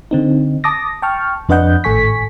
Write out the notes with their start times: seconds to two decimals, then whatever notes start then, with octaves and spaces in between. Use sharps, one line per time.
0.11 D3 C4 D#4
0.64 A5 D6 D#6 A#6
1.02 G5 A5 C#6 F6
1.49 F2 D4 B4 D#5 F#5 G6
1.84 G#1 A2 A4 G#5 C#6 B6